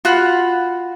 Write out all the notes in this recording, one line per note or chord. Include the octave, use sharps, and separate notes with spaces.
F4 F#4 F#5 B5